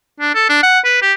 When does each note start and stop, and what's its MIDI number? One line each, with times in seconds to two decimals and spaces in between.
0.21 0.33 62
0.35 0.48 69
0.49 0.62 62
0.63 0.80 78
0.85 0.98 71
1.02 1.13 67